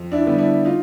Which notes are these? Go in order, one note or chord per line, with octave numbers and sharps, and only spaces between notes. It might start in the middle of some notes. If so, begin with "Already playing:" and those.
Already playing: F2
D4 E4
D3 G3 B3
D4 E4
D#4 F4